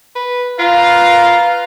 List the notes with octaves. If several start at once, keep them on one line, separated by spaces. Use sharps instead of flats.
B4
F4 B4 F5 A#5